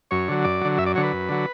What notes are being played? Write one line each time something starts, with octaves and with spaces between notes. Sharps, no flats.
F#2 C#5
D3 F#3
F#2 D5
D3 F#3
F#2 E5
D5
D3 F#3 C#5
B4
F#2
D3 F#3